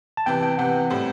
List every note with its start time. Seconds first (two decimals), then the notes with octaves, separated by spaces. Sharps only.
0.17 A5
0.26 C3 E3 B3 G5
0.43 G5
0.58 C3 E3 B3 F#5
0.90 A2 G3 C4